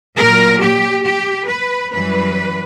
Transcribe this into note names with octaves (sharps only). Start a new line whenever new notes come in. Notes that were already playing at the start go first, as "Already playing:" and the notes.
A#2 F#3 A#4
G4
G4
B4
F#2 E3 G3 B4